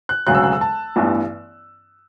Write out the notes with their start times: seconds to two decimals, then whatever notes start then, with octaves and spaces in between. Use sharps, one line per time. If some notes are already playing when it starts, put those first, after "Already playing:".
0.09 F#6
0.27 E1 D2 C#3 F#3 F#6
0.35 E6
0.43 F#6
0.53 E6
0.61 A5
0.96 A1 G2 E3 B3